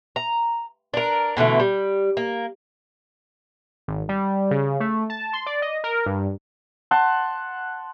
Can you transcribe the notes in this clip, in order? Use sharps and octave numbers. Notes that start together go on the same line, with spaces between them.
A#5
D4 A#4
B2 D3 E3 A3
G3
A#3
G#1
G3
C#3
A3
A5
C6
D5
D#5
A#4
G2
F#5 A5 C6